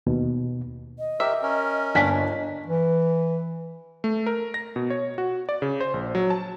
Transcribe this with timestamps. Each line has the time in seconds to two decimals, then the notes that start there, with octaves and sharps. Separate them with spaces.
0.07 D#2 B2
0.99 D#5
1.20 G4 A#4 E5
1.42 C#4 A#4
1.95 G1 A#3 D4 G#5 B6
2.66 E3
4.04 A3
4.27 A#4
4.54 A#6
4.76 B2
4.90 C#5
5.18 F#4
5.49 D5
5.62 C#3
5.80 C5
5.94 A#1
6.15 F#3
6.30 A5